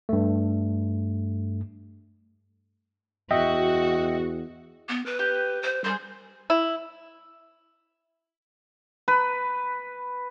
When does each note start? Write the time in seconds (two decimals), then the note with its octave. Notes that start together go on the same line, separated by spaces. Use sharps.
0.09 G2 A3
3.31 E2 F#4 D#5 E5 G5
4.89 B3
5.06 B4
5.19 G4
5.63 C5
5.84 G3 G#4 A#4 C5
6.50 E4
9.08 B4